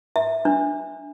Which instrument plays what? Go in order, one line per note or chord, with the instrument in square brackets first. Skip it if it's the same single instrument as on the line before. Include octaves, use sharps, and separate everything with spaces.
[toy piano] E5
D4